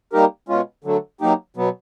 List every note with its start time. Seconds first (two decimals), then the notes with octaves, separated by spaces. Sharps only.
0.13 G3 A#3 D#4 G4 A#4
0.49 B2 G#3 C#4 F4
0.84 D3 F#3 A3
1.20 F#3 A#3 D#4 G4
1.56 B2 F#3 B3